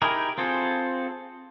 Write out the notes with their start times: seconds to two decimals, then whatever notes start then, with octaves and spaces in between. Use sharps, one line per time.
0.02 D#4 E4 G4 G#4 A#4
0.38 C4 F4 G#4 A4 C5